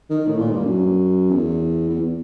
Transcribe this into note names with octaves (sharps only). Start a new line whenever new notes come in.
D#3
A2
A#2
G2
F#2
E2
E2